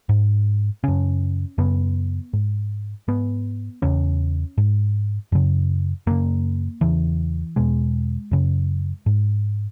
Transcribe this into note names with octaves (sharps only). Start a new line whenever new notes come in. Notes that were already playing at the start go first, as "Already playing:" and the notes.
G#2
F#2 C#3 C#4
F#2 C#3 B3
G#2
G#2 B3
E2 C#3 C#4
G#2
F#2 C#3
F#2 C#3 A#3
E2 C#3 E3
E2 B2 G#3
F#2 C#3
G#2